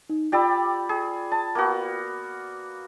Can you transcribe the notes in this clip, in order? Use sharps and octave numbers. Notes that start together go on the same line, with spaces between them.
D#4
F4 G4 D5 G5 B5 E6
G#4
A5
A#3 B3 F#4